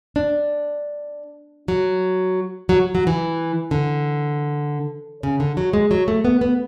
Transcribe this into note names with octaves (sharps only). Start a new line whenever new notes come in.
D4
F#3
F#3
F#3
E3
D3
C#3
D3
F#3
G#3
F#3
A3
B3
B3